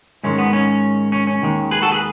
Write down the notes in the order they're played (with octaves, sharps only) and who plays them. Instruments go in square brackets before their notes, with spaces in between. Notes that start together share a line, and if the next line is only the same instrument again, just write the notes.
[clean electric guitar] G#2 D#3 G#3 C#4
B3
C#4
C#4
C#4
D#2 D#3 G#3
G#4 B4
F#4 A4
G#4 B4